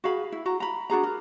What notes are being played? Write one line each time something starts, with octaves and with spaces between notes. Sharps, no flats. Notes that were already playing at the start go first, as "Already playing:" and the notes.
F#4 G#4 F5 B5
E4
F#4 A#5
A#5 B5
D4 F#4 G#4 A#5
A#4